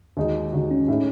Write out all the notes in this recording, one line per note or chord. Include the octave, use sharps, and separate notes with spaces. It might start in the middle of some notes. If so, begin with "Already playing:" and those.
D#2 D#3 G#3 D#4 F#4
D#2 D#3 G#3 D#4 F#4
C#4
A2 G#3 C#4 D#4